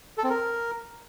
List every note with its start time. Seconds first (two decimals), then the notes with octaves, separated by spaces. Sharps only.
0.18 A4
0.24 C4
0.30 A#4